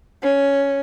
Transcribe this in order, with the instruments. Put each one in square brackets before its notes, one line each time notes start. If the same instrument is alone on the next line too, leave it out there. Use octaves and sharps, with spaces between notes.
[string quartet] C#4